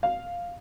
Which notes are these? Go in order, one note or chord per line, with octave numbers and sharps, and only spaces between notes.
F5